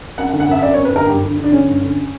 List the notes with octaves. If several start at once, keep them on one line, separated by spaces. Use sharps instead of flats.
F#2 F#5
F#5
D3
F#5
F#2 E5
E5
F#2 D5
C#5
F#2
B4
D3 A#4
G2 G4
D3
D3
D4
D3 C#4
G2
D3